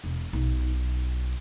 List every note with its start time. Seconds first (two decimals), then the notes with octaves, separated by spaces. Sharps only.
0.04 E1
0.33 B1